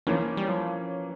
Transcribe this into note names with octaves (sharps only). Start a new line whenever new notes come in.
E3 F3 A#3 C#4
G3
F3